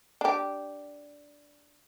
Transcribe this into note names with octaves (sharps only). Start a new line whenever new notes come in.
D4 G4